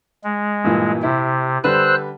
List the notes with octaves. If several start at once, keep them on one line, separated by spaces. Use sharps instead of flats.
G#3
G2 A#2 E3
C3 E4
D3 G3 B4 C5 E6 F#6